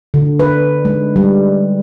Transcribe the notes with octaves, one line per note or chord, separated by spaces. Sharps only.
D3
B4
G#3
G3